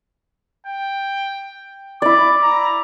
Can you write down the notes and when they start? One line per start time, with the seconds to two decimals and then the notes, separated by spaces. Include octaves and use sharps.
0.67 G5
2.02 E4 D5 D6
2.42 A#5